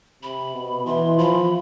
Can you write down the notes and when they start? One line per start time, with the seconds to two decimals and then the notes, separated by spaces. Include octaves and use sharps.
0.23 C3 B5
0.55 B2
0.86 E3 C6
1.18 F3 B5